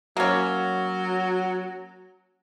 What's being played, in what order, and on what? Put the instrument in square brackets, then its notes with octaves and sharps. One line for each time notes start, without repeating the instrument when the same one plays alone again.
[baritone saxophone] F#3 [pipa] A#3 C#4